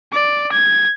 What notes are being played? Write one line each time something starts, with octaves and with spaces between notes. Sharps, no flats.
D5
G#6